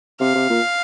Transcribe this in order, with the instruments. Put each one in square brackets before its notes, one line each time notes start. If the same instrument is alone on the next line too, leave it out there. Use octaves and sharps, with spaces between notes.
[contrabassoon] C3 [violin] F5
[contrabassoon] C3
A#2